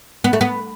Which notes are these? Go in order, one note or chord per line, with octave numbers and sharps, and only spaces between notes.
B3
A3
B3